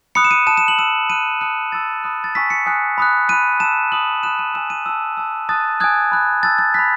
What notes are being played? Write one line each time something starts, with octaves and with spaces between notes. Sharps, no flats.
B5 D#6 F#6 C#7
E7
D#7
A5 D#6 F#6 E7
E7
F#7
A5 E6 E7
B5 F#6 D#7
A5 D#6 F#6 C#7
B5 E6 A6
B5 D#6 F#6
A6
G#5 C#6 E6 B6
C#7
G#5 D#6 F#6
B5 D#6 F#6
B5 F#6 D#7
A5 E6 E7
B5 D#6 F#6 F#7
B5 D#6 F#6 E7
D#7
G#5 B5 E6 E7
D#7
A5 E6
A5 E6
A5 D#6 F#6 A6
G#5 D#6 F#6 G#6
B5 F#6
A5 E6 A6
A6
B5 F#6 B6